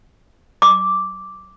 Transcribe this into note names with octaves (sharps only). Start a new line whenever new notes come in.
D6